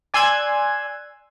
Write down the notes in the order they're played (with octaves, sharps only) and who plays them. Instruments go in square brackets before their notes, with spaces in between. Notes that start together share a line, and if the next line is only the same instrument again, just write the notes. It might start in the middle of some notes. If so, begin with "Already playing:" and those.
[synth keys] D5 G#5 C6 E6 F#6 G#6